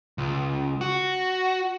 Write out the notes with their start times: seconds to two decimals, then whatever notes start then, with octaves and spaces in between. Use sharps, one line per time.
0.18 C#2
0.81 F#4